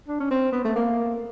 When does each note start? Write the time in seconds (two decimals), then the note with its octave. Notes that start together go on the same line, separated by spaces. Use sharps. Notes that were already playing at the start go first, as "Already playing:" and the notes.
0.08 D4
0.20 C#4
0.31 C4
0.53 B3
0.65 A3
0.76 A#3